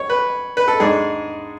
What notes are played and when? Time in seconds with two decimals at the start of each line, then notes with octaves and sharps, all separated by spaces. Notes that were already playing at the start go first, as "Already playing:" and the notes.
Already playing: C#5
0.10 B4
0.57 B4
0.68 A4
0.80 G#2 G#3 D4 G#4